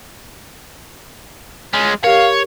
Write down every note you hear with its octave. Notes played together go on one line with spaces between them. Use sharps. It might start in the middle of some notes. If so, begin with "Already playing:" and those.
G#3 C#4
G4 A#4 C#5 F5